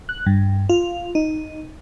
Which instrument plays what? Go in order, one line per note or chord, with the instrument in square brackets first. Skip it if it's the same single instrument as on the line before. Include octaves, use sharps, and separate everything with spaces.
[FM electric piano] F#6
G2
F4
D#4